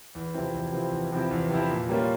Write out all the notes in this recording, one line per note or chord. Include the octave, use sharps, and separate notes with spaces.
E2
C3 F3 C4 E4
E2
C3 F3 C4 E4
E2
C3 F3 C4 E4
E2
C3 F3 C4 E4
A#2
G3 A#3 C#4 F4